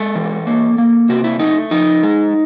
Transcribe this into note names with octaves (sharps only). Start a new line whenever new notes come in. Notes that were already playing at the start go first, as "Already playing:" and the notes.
Already playing: G#3 A4
E3
A#3
A#3
C3 F#4
E4
A3 D#4
F3 D#4
G#3